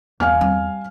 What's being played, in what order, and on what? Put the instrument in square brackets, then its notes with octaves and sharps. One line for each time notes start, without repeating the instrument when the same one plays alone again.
[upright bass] G1 E3 [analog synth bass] E2 [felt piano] F5 G#5 F6
[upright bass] G3 C4